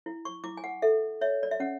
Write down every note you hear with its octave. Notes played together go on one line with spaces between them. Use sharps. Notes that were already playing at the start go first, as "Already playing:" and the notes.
E4
C#6
E4 D6
G#5
F#5
A4 E5
C#5 E5
D5
E5
C#4 F#5